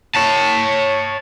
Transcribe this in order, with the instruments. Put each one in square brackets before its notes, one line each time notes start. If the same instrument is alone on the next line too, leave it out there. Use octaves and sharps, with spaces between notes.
[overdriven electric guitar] C#5 A5